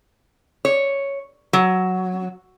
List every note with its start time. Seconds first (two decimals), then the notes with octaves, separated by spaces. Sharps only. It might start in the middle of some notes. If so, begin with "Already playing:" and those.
0.65 C#5
1.53 F#3